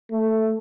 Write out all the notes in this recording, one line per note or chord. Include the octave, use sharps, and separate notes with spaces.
A3